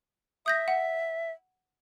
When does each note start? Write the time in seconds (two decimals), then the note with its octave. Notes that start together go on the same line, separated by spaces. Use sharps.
0.46 E5 D#6 G6 A#6
0.68 F#5